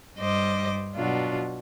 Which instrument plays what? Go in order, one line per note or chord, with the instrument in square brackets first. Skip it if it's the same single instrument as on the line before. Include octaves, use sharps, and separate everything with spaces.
[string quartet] G2 G3 C5 D#5 D6
B2 F#3 D4 F4